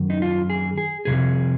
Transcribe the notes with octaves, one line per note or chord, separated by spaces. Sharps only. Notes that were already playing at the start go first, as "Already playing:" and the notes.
Already playing: F#2 D#3
D#4
F4
G#4
G#4
F2 C3 G#4